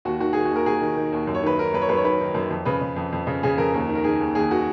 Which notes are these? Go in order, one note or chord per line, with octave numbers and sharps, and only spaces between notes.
D#2 F#4
D#3 F#4
D#3 G#4
F#4
D#2 A#4
D#2 G#4
D#3
D#3
D#2
F#2
C#5
D#3 B4
D#3 A#4
F#2 B4
C#5
F#2 B4
C#5
D#3 B4
D#3
F#2
F2
C#3 B4
C#3
F2
F2
C#3
C#3 G#4
F2 A#4
D#2
D#3
A#4
D#3 G#4
D#2
D#2 G#4
D#3 F#4